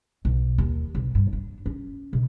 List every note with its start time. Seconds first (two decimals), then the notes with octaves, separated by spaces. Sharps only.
0.25 B1
0.58 D#2
0.95 B1
1.15 G2
1.33 D4
1.66 C#4
2.13 B2